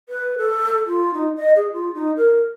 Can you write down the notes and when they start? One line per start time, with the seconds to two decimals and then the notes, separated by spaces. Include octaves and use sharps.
0.09 B4
0.38 A4
0.87 F4
1.14 D#4
1.37 D#5
1.56 G#4
1.73 F4
1.95 D#4
2.17 A#4